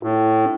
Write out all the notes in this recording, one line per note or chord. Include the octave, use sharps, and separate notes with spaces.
A2